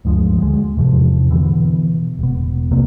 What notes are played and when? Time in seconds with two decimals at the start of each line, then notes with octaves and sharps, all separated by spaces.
0.05 D2 G2 F3 G#3
0.38 D2 G#3
0.77 E2 G#2 C3 F3
1.31 B2 D3 E3
2.19 E1 B2
2.71 E1 C2 C3 A#3